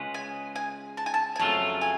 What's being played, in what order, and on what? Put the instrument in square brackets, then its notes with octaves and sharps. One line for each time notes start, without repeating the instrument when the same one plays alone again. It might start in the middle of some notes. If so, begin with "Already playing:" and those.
Already playing: [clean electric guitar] C#3 G#3 C#4 F4 B4
[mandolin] G#5
G#5
A5
G#5
A5
G#5
[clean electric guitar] F2 C#3 F#3 A3 F4 [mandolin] A5
[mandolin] G#5